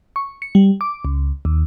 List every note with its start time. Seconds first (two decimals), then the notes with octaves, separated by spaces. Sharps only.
0.16 C#6
0.42 C#7
0.55 G3
0.81 D6
1.05 C#2
1.45 D#2